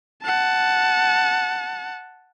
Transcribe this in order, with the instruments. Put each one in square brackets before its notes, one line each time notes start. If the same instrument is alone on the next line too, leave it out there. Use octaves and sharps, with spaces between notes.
[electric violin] F#5 A5